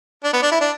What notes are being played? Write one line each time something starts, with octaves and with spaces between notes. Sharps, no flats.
D4
B3
D4
E4
D4